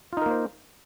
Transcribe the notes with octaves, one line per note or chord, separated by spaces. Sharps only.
A#3 D#4 F4 A#4 C5